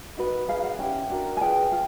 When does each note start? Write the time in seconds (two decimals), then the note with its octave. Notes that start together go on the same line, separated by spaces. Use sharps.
0.17 D#4 F#4 B4
0.48 D#4 G#4 B4 F5
0.64 F#5
0.79 C#4 E4 G4 G5
1.10 D4 F#4 A#4
1.37 G#5
1.41 F4 G#4 B4 G5
1.72 F4